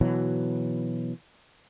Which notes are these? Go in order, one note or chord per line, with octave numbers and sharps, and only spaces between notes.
B2 E3 F#3